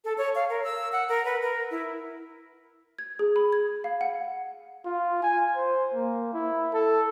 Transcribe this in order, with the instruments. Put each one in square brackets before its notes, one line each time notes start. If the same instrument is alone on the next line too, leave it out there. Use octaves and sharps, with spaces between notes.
[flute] A4
C#5
F5
A#4
E6
F#5
A#4
B4
A#4
E4
[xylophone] G#6
G#4
B5
G#6
F5
F#5
[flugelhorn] F4
G#5
C5
A#3
E4
A4